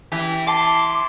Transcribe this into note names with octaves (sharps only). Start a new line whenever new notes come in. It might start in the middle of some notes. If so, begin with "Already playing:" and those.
E3 G4
A5 C6 D6